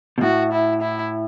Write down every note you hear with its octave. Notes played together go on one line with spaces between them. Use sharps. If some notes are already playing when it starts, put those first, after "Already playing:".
B2
A2 F#4
E4
E4